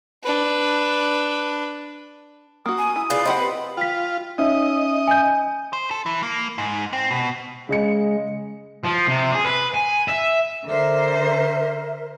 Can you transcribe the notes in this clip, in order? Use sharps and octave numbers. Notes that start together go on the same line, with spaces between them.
D4 B4
A#3 F#4 D#6
G#5
E4
C#3 F4 B4 D5
C4 G4 D#5 F#5 B5 C6
B4
F4 G5 B6
C#4 D#4 D#5 E5
G#5 G6
C5
A4
E3
A#3
G#2
C4
B2
C#3 G#3 D#5 C#7
F3
C3
G#4
B4
G#5
E5
D3 A#4 C5 E5